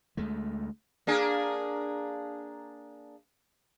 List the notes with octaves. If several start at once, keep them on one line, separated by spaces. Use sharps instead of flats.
D2 G#3 A3
A#3 D4 G#4